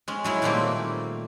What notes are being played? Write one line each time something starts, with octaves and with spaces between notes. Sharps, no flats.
G#3 C#4
F#3 G#3 E4
A#2 D#3 G3 A3 A#3 C4